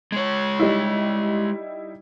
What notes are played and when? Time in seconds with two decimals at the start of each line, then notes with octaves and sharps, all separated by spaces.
0.12 G#3 C#5
0.59 G3 D#4 E4